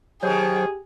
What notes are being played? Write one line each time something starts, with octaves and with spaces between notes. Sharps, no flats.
B2 D#3 F#3 G4 G#4 C5